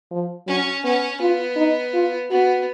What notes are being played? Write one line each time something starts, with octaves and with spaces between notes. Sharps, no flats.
F3
F#3 C#4
B3 C#4
B3 F4
D#4
F4
B3 F#4